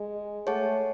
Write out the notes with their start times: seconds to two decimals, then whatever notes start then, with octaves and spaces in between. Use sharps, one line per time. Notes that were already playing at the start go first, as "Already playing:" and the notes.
Already playing: G#3
0.47 A3 G#4 C#5 F#5 A5